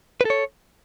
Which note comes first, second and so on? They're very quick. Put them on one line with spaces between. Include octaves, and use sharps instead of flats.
B4 A4 C#5